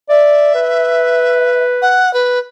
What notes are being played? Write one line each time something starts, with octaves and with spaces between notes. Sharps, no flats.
D5 E5
B4
F#5
B4